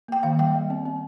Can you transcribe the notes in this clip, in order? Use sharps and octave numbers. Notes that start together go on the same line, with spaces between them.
A#3 G5
D#3 F5
G3 G5
G3
C4
C4